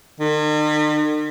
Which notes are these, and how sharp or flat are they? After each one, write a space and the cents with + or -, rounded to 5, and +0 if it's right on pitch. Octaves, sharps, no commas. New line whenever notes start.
D#3 -45